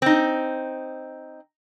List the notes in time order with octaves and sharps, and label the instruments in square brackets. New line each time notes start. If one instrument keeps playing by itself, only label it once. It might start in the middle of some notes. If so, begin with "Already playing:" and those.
[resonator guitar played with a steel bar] C4 D#4